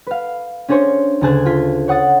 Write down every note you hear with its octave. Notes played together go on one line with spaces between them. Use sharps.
B4 F5
C#4 D4 G#4 C5 C#5
D2 C#3 G#4 A5 F#6 G#6
F4 G#6 B6
C#5 F#5 D#6 A6